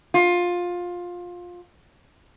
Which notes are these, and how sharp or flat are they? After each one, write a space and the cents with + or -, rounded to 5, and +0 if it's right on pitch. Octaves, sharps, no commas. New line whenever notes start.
F4 +15